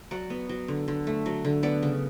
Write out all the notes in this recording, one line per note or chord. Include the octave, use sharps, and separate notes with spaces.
F#3 D5 F#5
B3
F#3
D3
D3
A3
F#3
D3
B3 D5 F#5
C#3